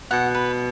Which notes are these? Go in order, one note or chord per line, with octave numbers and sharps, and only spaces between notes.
B2 F#5
B4